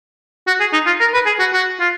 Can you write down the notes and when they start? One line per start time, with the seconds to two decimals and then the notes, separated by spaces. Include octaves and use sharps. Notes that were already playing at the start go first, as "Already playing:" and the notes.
0.47 F#4
0.60 G#4
0.73 D#4
0.86 F4
1.01 A#4
1.14 B4
1.26 G#4
1.40 F#4
1.53 F#4
1.80 F4